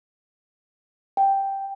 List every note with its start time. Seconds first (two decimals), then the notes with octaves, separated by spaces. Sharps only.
1.17 G5